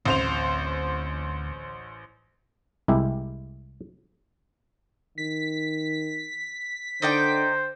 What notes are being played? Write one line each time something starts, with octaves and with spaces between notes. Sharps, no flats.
A1 D2 C4 C5 F7
C2 G#3 E4 G4
D#3 B6
D3 D#4 C5 D5 G5